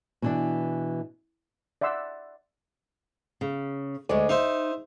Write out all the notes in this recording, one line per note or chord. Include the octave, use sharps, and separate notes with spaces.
B2 E3 D4
D5 E5 F#5 C6 E6
C#3
D2 G#3 C#5 D5
D#4 C5 E5 F5